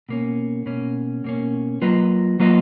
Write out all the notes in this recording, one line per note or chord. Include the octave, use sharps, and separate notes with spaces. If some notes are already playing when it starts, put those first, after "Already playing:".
B2 A#3 C#4
B2 A#3 C#4
B2 A#3 C#4
F#3 A#3 F4 B4 D#5
F#3 A#3 F4 B4 D#5